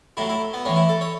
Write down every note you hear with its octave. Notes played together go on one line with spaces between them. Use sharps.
A2 F#3 E4
E4
B3
A2 E3 C#4
E4
A4
C#5